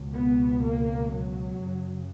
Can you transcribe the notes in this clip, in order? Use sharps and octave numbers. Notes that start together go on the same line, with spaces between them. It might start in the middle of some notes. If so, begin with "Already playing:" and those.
Already playing: C#2 B2
B3
A#3
F#3
F#2 C#3